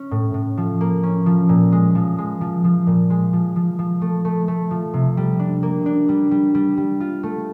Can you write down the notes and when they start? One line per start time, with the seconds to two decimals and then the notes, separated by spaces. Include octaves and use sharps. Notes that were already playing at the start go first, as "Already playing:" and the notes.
Already playing: C#4
0.11 A2
0.34 A2
0.57 F3
0.81 A#3
1.03 C#4
1.26 F3
1.49 A#2
1.72 G#3
1.95 F3
2.18 G#3
2.41 F3
2.64 F3
2.87 A#2
3.10 G#3
3.33 F3
3.56 F3
3.79 F3
4.02 A3
4.25 A3
4.48 A3
4.71 F3
4.94 C3
5.17 G3
5.39 D4
5.63 A#3
5.86 D4
6.09 G3
6.31 G3
6.55 G3
6.77 G3
7.00 F4
7.23 A3